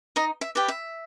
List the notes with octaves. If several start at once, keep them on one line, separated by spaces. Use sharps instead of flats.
D#4 D#5
E5
G4 B4 D5
E5